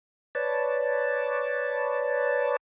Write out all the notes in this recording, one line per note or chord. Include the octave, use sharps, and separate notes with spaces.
B4 C#5 D5 A5